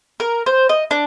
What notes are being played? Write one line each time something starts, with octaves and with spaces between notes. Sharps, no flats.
A#4
C5
D#5
D4